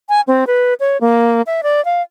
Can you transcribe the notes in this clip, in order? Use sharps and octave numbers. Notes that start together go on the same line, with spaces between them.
G#5
C4
B4
C#5
A#3
E5
D5
F5